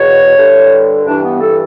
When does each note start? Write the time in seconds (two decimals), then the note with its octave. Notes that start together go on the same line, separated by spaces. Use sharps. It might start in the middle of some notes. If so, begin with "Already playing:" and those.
Already playing: E2 B2 C#5
0.36 G2 D3
1.05 G2 E3 D4
1.23 B3
1.40 A4